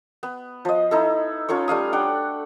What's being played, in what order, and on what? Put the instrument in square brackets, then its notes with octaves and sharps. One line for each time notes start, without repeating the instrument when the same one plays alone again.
[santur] B3
F3 D#5
D#4 E4 A4
C#4 F4 A4 C#5
G3 A3 F5 D#6
D4 F#5 G5